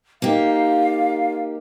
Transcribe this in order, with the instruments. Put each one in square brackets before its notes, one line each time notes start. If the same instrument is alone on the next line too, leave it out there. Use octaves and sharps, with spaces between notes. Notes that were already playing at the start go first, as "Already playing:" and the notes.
[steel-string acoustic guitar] A#3 D#4 G4 [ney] F5